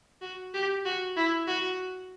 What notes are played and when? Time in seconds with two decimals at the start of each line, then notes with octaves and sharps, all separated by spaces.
0.22 F#4
0.54 G4
0.85 F#4
1.17 E4
1.47 F#4